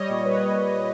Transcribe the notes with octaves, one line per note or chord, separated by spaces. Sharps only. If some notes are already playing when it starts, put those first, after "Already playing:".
Already playing: G3 C#5 D#5
A#2
G3 B4 C#5